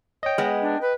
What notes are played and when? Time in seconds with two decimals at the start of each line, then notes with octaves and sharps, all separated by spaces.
0.23 C#5 D#5 G5
0.38 G#3 B3
0.61 D4
0.81 B4